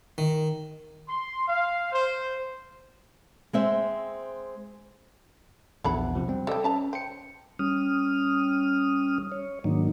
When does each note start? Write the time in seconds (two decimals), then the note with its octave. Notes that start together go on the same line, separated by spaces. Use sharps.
0.18 D#3
1.07 C6
1.47 F5
1.92 C5
3.53 G#3 C4 E5
5.84 A#1 E2 E3 D4 F#5 B5
6.15 C3 F3
6.28 G3 C4
6.47 G3 A4 D5 D#5 G5
6.64 C#4 B4 A5 A#5
6.93 C5 G5 C#7
7.59 G3 C#4 D#6 F6
9.32 C#5
9.64 G#2 D#3 F#3 A#3 D4 D#4